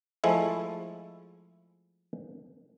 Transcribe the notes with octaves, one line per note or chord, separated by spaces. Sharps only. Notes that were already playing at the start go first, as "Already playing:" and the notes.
F3 G#3 A3 E4